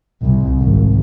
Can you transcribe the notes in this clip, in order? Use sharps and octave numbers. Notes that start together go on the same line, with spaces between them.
C2
G#1